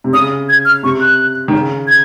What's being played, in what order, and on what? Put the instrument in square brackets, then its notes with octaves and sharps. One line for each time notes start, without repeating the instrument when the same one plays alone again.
[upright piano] C3
[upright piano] C#3 [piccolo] D#6
[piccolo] G#6
F6
[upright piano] C3 [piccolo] C#6
[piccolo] F#6
[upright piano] D#3
C#3
[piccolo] G#6